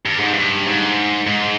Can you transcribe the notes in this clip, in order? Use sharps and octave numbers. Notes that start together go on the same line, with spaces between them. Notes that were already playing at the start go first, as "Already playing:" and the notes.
G2
G#2
G2
G#2
G#2